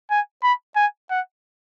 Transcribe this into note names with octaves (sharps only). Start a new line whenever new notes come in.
G#5
B5
G#5
F#5